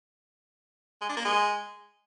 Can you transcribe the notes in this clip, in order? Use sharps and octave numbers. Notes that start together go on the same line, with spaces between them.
G#3
D4
A#3
G#3